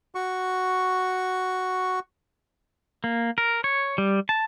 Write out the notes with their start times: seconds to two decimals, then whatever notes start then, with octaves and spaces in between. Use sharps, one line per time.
0.15 F#4 C#6
3.04 A#3
3.38 A#4
3.64 C#5
3.98 G3
4.29 A5